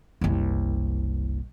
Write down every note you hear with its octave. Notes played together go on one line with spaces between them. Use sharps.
F#1 C2